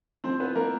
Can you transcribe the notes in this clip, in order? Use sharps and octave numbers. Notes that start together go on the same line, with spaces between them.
F3 C4 C5
B3 B4
F3 A#3 A#4